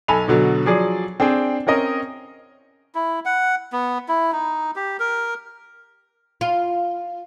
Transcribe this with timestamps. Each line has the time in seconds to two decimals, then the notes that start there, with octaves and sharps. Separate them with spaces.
0.08 B1 A4 G#5 B5 F7
0.28 B2 D3 F#3
0.66 F3 F#3 G#4 D5
1.20 C4 D4 G#4 G5
1.67 C4 C#4 A#4 D#5
2.95 E4
3.25 F#5
3.73 B3
4.08 E4
4.33 D#4
4.76 G4
5.00 A#4
6.41 F4